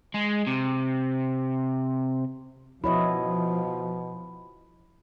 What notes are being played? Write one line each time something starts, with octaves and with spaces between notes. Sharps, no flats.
G#3
C3
B2 F3 E4 C#5 D#5 B5